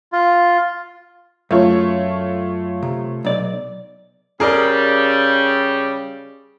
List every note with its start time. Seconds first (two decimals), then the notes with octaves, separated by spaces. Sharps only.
0.12 F4
1.51 F#2 A3 F4 C#5
2.83 C3
3.25 B1 D5
4.40 C#3 G3 G#4 A#4 D5